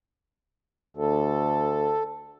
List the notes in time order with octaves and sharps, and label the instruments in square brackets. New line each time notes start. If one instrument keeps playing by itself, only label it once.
[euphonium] D2 [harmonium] A4